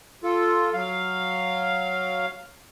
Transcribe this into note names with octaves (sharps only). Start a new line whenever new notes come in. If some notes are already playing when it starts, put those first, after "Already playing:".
F4 A4
F#3 F5